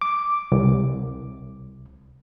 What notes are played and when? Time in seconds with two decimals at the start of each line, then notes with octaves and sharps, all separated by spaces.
0.01 D6
0.52 C2